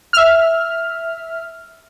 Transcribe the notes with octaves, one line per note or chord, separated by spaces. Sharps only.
E5 F6